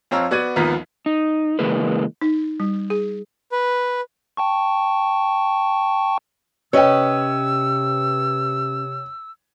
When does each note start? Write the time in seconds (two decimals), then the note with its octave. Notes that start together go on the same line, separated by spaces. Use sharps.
0.11 F2 C4 C#5 F5 A#5 E6
0.31 B3 F#4 D5 G#6 D#7
0.56 G#1 D#2 F3 B3 A#5 B6
1.06 D#4
1.59 C#3 E3 G#3 A#3 B4
2.21 D#4
2.60 G3
2.90 G#4
3.52 B4
4.37 G5 A5 C#6
6.73 C3 C#4 B4 C#5 D#5 G5 E6